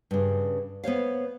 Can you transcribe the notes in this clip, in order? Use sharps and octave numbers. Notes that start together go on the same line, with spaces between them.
G2 C#3
B3 C5 C#5 F5